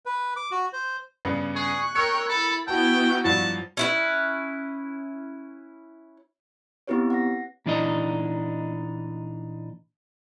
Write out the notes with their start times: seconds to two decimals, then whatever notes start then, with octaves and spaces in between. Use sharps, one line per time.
0.06 B4
0.36 D6
0.51 F#4
0.73 C5
1.25 G2 C#3 B3
1.56 G#4 C#6 F#6
1.95 A#4 C#5 G5 E6 C#7
2.29 E4 A4 B5
2.68 B3 E4 F#4 G5 A5
3.24 G2 F3 F#3 A5
3.77 C#4 E4 B4
6.87 B3 C4 E4 G4 B4 C#5
7.10 F#5 A#6
7.66 A#2 E3 D4 D#4 D#5